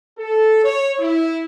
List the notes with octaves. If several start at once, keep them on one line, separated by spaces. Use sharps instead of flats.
A4
C#5
E4